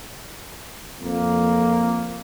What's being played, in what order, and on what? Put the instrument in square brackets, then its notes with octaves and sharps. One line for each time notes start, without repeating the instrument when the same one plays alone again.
[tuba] F2 [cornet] A#3